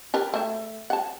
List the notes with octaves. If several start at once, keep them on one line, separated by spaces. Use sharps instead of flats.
G4 A#4 B4
A3 E5
F#5 A5